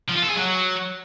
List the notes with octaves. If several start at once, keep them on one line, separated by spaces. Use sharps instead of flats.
F3
F4
A4
G#4
F#3